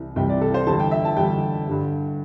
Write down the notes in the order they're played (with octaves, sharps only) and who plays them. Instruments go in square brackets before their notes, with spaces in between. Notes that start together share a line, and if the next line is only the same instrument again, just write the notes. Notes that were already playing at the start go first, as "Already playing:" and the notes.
Already playing: [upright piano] C2 C3 E3 G3
C2 C3 E3 G3 G5
D5
A4
C5
E2 D3 G3 A5
G5
E5
A5
E2 D3 G3 G5
G2 D3 G3